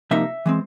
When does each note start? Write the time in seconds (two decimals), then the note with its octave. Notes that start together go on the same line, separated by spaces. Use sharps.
0.11 C3 F3 A#3 D#4 E5
0.46 E3 G#3 C4